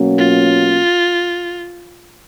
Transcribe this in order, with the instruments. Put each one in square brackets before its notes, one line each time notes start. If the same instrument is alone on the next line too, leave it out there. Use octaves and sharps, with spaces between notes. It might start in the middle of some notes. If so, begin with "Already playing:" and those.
Already playing: [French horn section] B2 F#3 A#3 C#4
[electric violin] F4